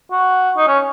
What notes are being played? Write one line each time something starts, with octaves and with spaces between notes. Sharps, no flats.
F#4
D#4
C#4